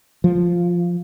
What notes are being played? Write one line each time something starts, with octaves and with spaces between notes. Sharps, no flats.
F3